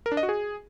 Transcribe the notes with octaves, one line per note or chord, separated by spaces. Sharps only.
A#4
D4
D#5
F#4
G#4